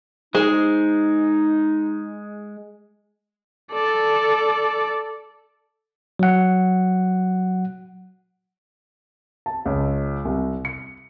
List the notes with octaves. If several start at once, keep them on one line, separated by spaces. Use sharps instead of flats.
G#3 D#4 G#4 C5
A4 D5
F#3 F#5
A5
C#2
C2
C#7